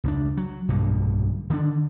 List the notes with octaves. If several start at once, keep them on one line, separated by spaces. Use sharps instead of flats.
C#2 A3 D4
F#3
B1 G2 A#2 D3
D3 D#3 A3 D4